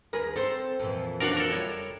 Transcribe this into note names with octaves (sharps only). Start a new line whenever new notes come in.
D#2 G#4 A#4 B4
C4 A4 C5
F2 A#2 E3
F#3 D4 F#4 A#4 F5 F#5
A4 A#4
G3 C#5